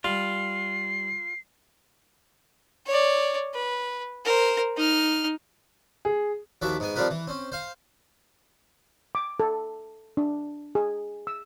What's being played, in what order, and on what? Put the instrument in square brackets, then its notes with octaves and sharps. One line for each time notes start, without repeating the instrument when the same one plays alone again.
[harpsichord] G3 [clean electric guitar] F4 [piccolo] C7
[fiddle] C#5 D5
B4
A#4 C5
D#4 F6
[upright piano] G#4
[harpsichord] D#2 F3 F#4 E5 D6
G#2 G#3 B3 G#5
F3 G3 C4 F4 A#4 B4
E3
C4 C#4
C5 F5
[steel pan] D6
A4
D4
G#4
E6